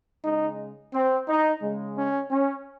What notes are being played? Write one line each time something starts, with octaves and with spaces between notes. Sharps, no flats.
C#3 G#3 D#4
C4
D#4
C#3 G#3
C#4
C#4